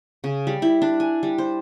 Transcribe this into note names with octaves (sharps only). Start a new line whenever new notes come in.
C#3
G3
E4
D4
G#5
G3
C5